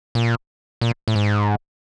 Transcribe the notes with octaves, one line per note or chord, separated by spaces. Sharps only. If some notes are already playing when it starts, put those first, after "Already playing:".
A#2
A#2
A2
G#2